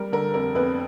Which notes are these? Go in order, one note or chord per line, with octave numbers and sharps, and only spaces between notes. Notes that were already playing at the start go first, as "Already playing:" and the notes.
Already playing: G3 A#4
D3 A#4
F2 A#4
F2 B3 B4